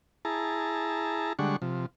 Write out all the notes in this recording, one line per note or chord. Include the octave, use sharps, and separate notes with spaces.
E4 G#4 A5 A#5
D3 G3 G#3 D4 F#5 C#6
C3 F3